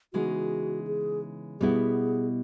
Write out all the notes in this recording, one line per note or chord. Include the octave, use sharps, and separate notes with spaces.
C#3 E3 G#3 B3 D#4 F#4
G#4
B2 G3 B3 E4 G#4